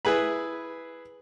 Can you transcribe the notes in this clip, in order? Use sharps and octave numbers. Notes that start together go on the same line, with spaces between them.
E4 G#4 B4 B5